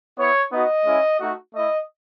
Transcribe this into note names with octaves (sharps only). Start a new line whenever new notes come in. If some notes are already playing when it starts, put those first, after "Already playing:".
B3 E4 C#5
B3 D#4 F#4 D#5
G#3 C#4 E4
A3 D#4 F#4
A3 E4 D#5